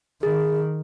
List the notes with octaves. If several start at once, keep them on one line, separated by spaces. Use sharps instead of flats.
D#3 G#4